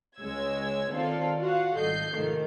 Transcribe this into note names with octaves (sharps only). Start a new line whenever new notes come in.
C#2 G#3 C#5 E6 G#6
D#3 C4 F4 A4 D5 F5
F4 F#4 F5 F#5
G#1 G3 A4 D#5 G6 C7
G#2 C3 D#3 F3 A3